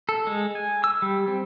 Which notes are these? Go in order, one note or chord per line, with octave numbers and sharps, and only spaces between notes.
A4
G#3
G#5
E6
G3
C4